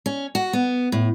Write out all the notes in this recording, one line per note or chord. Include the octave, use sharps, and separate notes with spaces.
C#4
F#4
B3
A2